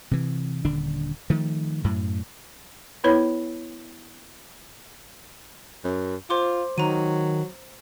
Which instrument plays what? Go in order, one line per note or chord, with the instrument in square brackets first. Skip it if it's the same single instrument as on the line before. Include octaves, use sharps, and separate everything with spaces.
[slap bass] C3 E3
D#1 D3 D4
D#3 F3 A3
F#2 A2
[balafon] B3 E4 B4 C#5 B5
[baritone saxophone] F#2
[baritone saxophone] F4 [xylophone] C5 C6 D6
[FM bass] D#3 [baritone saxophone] F#3 [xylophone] A#5 D#7